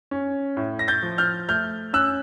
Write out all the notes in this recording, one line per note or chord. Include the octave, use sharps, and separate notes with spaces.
C#4
A2
A#6
G6 A6
F3
F6 G6
A3 F6 G6
C#4 E6 F#6